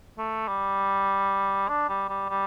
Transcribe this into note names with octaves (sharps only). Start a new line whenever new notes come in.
A3
G3
D4
G3
G3
G3